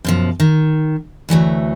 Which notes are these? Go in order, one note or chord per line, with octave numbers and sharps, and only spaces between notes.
F#2 B2 F3
D#3
D2 E3 F#3 A3